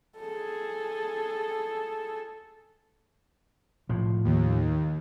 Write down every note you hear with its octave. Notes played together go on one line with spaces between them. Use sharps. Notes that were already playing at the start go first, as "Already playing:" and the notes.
G#4 A4
A2 F3
D#2